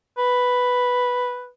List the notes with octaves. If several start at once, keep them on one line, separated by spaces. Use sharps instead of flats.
B4